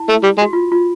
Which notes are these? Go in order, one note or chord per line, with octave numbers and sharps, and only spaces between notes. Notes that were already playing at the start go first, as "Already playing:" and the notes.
Already playing: E4
A3
G3
G#3
F#4
F4
F4